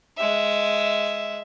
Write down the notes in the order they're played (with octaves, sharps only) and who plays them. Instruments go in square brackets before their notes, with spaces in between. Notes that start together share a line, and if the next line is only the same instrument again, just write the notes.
[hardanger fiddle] G#3 E5